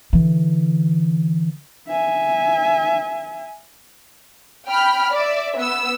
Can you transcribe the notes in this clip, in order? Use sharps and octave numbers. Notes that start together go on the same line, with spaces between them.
D3 E3
E5 G#5
G5 B5 F6
D5 E5
B3 E6